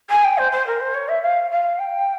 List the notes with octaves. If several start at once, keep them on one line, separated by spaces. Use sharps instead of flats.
G#5
G5
C5
C5
A#4
C5
C#5
E5
F5
F5
G5